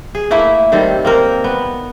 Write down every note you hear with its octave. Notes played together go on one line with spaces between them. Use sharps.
G#4
A3 A#3 E4 E5
D#3 G3 C4 A4
A#3 C4 A#4
B3